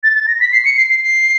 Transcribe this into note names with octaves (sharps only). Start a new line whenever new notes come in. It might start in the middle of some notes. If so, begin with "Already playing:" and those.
A6
A6
A#6
B6
C7
C#7
C7
C7
C7